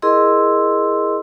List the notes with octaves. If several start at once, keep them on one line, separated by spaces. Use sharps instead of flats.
E4 G#4 A#4 D#5 C6 E6